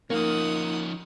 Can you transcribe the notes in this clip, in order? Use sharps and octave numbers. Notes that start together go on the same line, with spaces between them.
F3 A#3 C#4 D#4 F#5 D#6